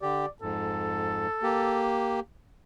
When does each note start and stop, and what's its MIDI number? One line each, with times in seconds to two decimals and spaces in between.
0.02 0.26 50
0.02 0.26 67
0.02 0.28 74
0.42 1.28 41
0.42 1.28 44
0.42 1.88 69
1.42 2.20 58
1.42 2.20 67